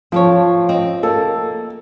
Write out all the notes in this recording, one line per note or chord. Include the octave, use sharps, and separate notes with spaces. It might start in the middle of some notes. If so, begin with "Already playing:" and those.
F3 C4 A4 C#5
C4 D#5
A#3 A4